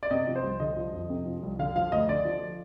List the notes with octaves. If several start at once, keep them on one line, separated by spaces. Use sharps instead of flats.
D5
C3 D#5
F3
C5
C2
D3 D#5
F3
F2
C3
F3
C2
D3 F5
F3 F5
D2 D#5
D3 D5
F3